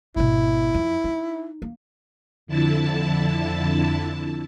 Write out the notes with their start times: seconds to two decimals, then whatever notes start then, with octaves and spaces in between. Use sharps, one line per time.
0.16 G#1 B2 E4
0.74 F2
1.04 D#4
1.62 A#3
2.47 F2 D3 E4 A5